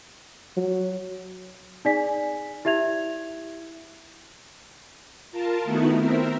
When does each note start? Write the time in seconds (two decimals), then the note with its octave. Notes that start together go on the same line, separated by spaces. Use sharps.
0.57 F#3
1.85 D#4 G#4 D5 G#5 B6
2.65 E4 G4 E5 G#6 F7
5.32 F4 A#4 A5
5.64 D#3 A3 B3 D#4 E4 F#4
5.99 C4 A#4 E5